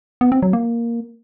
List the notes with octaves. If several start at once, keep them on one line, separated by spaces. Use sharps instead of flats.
B3
C4
F#3
A#3